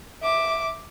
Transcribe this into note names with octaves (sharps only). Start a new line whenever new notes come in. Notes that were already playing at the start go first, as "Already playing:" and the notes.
E5 D6